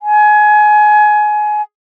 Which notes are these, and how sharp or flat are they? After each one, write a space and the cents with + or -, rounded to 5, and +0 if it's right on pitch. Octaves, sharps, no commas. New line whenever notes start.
G#5 +25